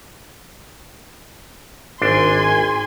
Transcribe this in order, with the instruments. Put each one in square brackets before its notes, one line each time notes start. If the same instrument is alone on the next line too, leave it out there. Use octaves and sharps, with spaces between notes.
[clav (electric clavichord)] G#1 D4 [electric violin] G#5 C6